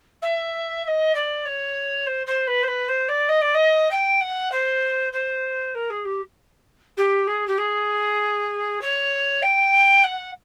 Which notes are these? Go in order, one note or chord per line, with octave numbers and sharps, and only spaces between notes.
E5
E5
D#5
D5
C#5
C5
C5
B4
C5
B4
C5
D5
D#5
D5
D#5
G5
F#5
C5
C5
A#4
G#4
G4
G4
G#4
G4
G#4
C#5
G5
F#5